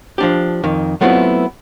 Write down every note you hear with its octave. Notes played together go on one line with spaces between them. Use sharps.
F3 D4 G4
F2 D#3
F#3 A3 B3 C4 E4 F4